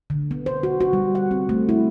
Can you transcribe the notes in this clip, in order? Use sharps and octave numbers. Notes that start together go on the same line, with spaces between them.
D3
B3
C5
F#4
F#4
G3
F#5
C4
A3
E4